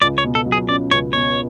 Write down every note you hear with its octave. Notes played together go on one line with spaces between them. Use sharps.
C#2 D5
C#5
B2
A4
F#3
G#4
C#4 D5
C#2 C#5
B2 C#5